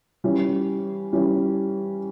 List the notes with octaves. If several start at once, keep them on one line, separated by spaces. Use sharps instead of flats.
E3 G3 C#4
E3 G3 C#4